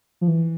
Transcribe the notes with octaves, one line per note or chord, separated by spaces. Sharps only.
F3
E3